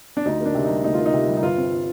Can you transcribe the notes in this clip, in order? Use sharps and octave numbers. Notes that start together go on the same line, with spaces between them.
D4
D2 D#4
A#3 D4
C3
G3 D#4
D2 D#4
A#3 F4
D#4
C3
G3
D#4
G1 F4
C4